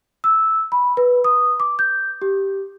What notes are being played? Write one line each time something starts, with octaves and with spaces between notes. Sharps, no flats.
E6
B5
B4
D#6
D6
G6
G4